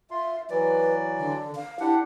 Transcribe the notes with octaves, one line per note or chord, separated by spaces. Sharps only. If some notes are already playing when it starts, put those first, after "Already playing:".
F4 E5 C6
E3 F#3 B4 D5
D3
F5
D4 E4 G4 F#5